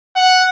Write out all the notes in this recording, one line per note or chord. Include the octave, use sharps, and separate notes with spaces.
F#5